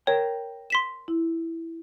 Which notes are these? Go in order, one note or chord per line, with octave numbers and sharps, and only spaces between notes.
A#4 C#5 G5
C6 B6 E7
E4